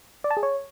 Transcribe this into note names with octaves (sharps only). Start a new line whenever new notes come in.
D5
A5
G#4
C#5